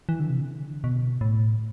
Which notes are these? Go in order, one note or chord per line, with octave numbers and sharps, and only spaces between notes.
E3
D3
C3
D3
B2
A2